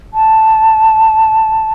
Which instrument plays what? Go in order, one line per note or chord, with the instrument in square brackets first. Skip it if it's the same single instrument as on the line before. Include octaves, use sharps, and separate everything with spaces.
[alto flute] A5